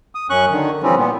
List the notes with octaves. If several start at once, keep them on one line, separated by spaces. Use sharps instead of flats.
D#6
F#2 C#4 C#6 F#6
D3 D#3
E3 F3 G3 C4 C#4
A#2 B3